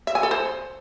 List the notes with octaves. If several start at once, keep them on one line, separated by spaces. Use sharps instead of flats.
E5
G#5
A4
C5